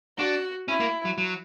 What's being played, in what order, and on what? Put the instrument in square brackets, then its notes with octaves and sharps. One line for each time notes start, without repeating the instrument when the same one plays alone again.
[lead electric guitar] D4 [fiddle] F#4
[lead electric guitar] C#4 [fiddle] E4
[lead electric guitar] A#3
F#3
F#3